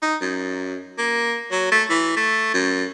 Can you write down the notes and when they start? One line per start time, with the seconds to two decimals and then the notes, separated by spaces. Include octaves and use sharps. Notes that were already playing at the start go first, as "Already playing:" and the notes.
0.02 D#4
0.22 F#2
0.98 A#3
1.51 F#3
1.72 A3
1.90 E3
2.16 A3
2.54 F#2